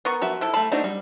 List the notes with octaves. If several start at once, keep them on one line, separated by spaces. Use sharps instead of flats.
B3 A#4 F#5 C#6
F3 F#4 E5
C3 E4 A4
A3 F5 A5 B5
A3 C4 D4 D#4 F#4
G3